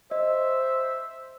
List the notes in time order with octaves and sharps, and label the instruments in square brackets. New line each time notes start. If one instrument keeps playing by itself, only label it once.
[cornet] C5 [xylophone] D#5 [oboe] E5